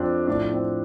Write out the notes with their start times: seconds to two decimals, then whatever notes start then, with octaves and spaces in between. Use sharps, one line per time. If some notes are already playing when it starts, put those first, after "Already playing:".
Already playing: F2 F3 C4 D4
0.27 A2 F3 D4
0.52 C4